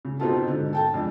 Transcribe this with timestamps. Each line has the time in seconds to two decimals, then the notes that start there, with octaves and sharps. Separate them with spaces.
0.05 C#3
0.20 B2 C4 D#4 F4 G4 A4
0.47 G#2 D3
0.73 A4 G5 A5
0.94 F2 G#3 D4